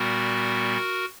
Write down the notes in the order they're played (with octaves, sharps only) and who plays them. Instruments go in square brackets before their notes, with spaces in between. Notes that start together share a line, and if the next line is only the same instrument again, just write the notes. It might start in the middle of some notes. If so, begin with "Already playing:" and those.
Already playing: [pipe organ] A#2 G3 B3 F#4 A#4